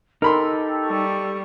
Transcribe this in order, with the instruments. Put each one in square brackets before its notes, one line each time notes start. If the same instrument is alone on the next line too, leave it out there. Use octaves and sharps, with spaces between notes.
[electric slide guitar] D#4 [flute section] G4 A4 [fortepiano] A#4 B5 C6
[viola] G3 C#6